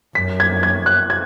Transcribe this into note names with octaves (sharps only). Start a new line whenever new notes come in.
F#2 B6
G#6
G#6
F#6
G#6